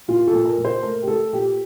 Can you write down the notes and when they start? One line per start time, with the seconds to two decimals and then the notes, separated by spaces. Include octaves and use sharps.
0.08 A#2 F4
0.27 A4
0.33 A#2
0.45 A#4
0.58 A#2
0.65 C5
0.83 A3 A#4
1.02 G4
1.08 A3 A4
1.33 A#2 G4